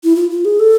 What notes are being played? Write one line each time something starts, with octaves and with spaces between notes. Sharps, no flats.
E4
F4
F4
G#4
A4